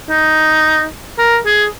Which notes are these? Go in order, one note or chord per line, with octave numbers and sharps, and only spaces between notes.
D#4
A#4
G#4